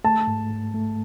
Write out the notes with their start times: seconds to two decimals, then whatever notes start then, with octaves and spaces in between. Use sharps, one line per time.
0.05 A3 A5
0.27 G#2
0.51 G#2
0.74 A3